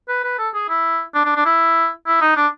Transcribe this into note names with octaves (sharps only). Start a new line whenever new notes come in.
B4
B4
A4
G#4
E4
D4
D4
D4
E4
E4
D#4
D4